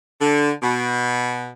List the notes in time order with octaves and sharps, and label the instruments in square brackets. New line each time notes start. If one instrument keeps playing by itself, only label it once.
[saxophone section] D3
B2